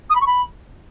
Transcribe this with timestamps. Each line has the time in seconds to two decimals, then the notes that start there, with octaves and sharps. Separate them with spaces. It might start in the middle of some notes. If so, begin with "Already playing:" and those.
0.10 D#6
0.15 B5
0.21 C#6
0.27 B5